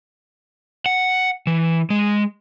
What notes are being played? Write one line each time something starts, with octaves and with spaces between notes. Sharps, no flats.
F#5
E3
G#3